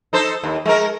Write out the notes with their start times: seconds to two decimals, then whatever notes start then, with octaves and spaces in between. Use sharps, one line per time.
0.13 D#4 A4 C5
0.43 D#2
0.66 G#3 A#4